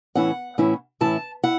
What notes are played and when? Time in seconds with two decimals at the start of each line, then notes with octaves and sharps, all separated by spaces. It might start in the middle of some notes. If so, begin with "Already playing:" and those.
0.15 A2 E3 C#4 E4 F#5
0.58 A2 E3 C#4 E4
1.01 A2 E3 C#4 E4 A5
1.43 E4 F#5